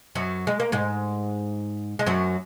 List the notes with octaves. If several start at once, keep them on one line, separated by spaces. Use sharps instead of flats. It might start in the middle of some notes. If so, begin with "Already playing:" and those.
F#2 F#3
G#3
A#3
G#2 G#3
G#3
F#2 F#3